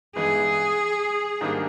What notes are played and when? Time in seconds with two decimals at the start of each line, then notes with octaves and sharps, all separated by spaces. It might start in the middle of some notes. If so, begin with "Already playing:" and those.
0.15 G2 E3 G#3 B3 D#4 G#4
1.41 G#2 D#3 G3 A#3 D4